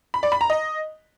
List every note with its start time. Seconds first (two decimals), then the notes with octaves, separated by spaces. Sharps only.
0.14 B5
0.23 D5
0.32 B5
0.41 A#5
0.50 D#5